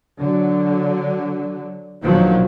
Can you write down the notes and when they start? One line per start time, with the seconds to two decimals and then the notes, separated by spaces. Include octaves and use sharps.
0.18 D3 F#3
2.02 A#1 B2 D#3 F3 F#3